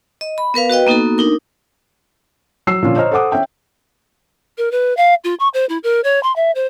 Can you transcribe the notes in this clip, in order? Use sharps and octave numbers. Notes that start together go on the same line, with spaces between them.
D#5
B5
B3 A#4 B4 F5
F#4 B4 D#5 G5
A#3 B3 D#4 F#4 A4
D4 D#4 A#4
F#3 C#5 E6 C7
A#2 D3 F3 C#4 F4
C5 C#5 D#5 A#5 F6
A4 C5 F#5 D6 D#6
C#4 E5 G5
A#4
B4
F5
F4
C#6
C5
E4
A#4
C#5
C6
E5
C5